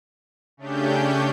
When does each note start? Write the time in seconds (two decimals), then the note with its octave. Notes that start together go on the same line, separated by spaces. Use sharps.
0.57 C#3 A3 C#4 D4 G4 G6